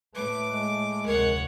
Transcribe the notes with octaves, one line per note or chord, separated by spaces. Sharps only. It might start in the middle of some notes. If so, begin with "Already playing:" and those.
A2 A3 B4 D6
G#3
F1 D2 A#4 C#5 F#5